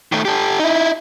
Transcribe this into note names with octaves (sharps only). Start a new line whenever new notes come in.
D#3 A3
G4 A4
D#4 E4